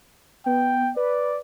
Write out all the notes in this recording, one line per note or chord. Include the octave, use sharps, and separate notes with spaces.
B3 G5
B4 D5